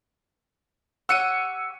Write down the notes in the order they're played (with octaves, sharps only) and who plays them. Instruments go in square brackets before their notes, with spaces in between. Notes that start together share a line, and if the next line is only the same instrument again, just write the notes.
[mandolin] G4 C#5 F#5 [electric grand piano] E6 C#7 D#7